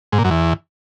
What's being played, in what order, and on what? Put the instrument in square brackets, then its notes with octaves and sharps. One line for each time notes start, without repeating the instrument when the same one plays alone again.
[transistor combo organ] G#2
A#2
F#2
E2